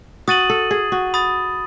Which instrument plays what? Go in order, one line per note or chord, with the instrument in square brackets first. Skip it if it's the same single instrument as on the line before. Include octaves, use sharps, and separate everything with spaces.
[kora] F#4 [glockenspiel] D#6 A6 D#7 F#7
[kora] A4
G#4
F#4
[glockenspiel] B5 D#6 A6